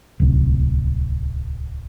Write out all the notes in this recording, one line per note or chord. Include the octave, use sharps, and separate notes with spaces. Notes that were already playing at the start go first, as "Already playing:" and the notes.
D1 C2